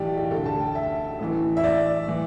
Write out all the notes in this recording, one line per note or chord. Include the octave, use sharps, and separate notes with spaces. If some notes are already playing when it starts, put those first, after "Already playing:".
Already playing: B1 A2 E3 G4 D5
G4
D2 D3 A4
A5
G5
E5
A1 A2 E3
E5
D5
A2 E3